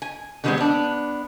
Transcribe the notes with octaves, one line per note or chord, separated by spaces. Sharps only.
G#5
D3 D#3 G3 G#3 B3 C4
B3 D4